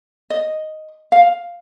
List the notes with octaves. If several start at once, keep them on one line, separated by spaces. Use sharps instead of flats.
D#5
F5